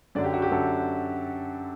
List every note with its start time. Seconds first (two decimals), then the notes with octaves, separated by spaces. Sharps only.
0.15 F#2 D3 F#3 D5
0.24 G4
0.33 F#4
0.42 G4
0.51 F#2 D3 F#3 A4